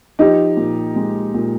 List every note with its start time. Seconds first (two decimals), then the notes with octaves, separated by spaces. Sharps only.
0.19 F3 D#4 G4
0.57 A#2
0.96 G#3
1.34 A#2